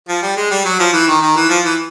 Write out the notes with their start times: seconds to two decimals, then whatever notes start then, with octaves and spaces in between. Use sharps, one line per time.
0.08 F3
0.22 G3
0.37 G#3
0.50 G3
0.65 F#3
0.79 F3
0.93 E3
1.07 D#3
1.21 D#3
1.36 E3
1.49 F3
1.65 E3